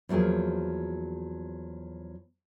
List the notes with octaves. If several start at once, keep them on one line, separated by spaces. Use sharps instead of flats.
E2 F3 F#3 A#3 G#4